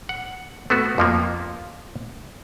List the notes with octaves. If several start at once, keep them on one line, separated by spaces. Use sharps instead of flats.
F#5
A3 B3 F#4
F2 F3 A#3